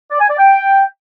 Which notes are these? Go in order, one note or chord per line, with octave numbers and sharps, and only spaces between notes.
D5
G#5
D5
G5